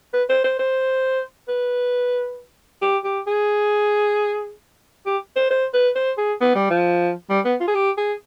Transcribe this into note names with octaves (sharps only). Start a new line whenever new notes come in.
B4
C5
C5
C5
B4
G4
G4
G#4
G4
C5
C5
B4
C5
G#4
B3
G3
F3
G3
B3
F4
G#4
G4
G#4